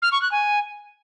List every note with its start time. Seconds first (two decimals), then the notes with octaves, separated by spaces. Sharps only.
0.02 F6
0.12 C#6
0.22 F#6
0.32 G#5